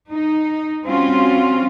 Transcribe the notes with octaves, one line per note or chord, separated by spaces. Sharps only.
D#4
G3 C4 C#4 F4 F#4